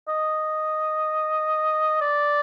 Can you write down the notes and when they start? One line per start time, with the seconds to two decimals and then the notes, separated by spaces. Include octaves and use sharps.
0.08 D#5
2.01 D5